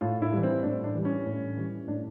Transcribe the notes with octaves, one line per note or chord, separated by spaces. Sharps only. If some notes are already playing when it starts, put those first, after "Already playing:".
A2 F4
E4
E3 G3
C4
A2 D4
D4
E3 G3
C#4
A2
E3 G3
A2 D4